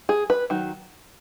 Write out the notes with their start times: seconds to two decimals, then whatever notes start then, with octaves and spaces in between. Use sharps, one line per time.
0.09 G#4
0.30 B4
0.50 D#3 F#3